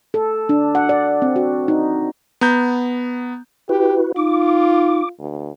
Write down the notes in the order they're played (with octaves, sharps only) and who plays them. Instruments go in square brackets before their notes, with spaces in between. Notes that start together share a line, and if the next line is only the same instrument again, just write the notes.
[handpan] A4
D4
F#5
D5
C4
F#4
D#4
[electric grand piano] B3 A#5 G6
[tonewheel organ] E4 F#4 B4 [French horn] G4
[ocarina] D#4 [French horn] F4 [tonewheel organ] D6
[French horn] D2